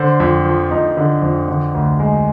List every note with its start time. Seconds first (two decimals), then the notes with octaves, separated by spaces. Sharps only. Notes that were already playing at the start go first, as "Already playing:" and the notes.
Already playing: D3 C5
0.20 F2
0.45 F3
0.71 F2 D#4
0.97 D3
1.22 F2
1.48 D3
1.74 D2
2.00 G#3